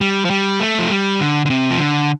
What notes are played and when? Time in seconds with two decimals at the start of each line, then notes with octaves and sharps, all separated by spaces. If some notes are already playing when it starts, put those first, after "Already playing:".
0.01 G3
0.25 F3
0.30 G3
0.60 A3
0.79 F3
0.90 G3
1.21 D3
1.46 D3
1.50 C3
1.71 F3
1.79 D3